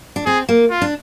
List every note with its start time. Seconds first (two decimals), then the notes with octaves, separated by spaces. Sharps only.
0.16 D4
0.26 C4 G#4
0.49 A#3
0.71 F4
0.82 D4